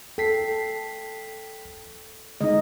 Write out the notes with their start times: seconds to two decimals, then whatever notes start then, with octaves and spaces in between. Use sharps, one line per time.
0.18 A4 G5 B6 C7
2.41 D3 G#3 D#4 D#5